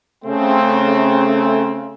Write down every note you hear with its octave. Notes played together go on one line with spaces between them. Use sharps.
C#3 A3 C4